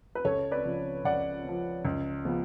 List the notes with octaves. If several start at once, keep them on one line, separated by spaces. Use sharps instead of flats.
B4
C#2 A4 C#5
B4 D5
C#3 F3
C#2 D5 F#5
C#3 F3
C#2
C#3 F3 B3